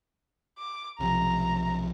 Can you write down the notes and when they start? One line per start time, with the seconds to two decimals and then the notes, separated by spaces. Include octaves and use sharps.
0.59 D6
1.00 B1 C3 F3 A#5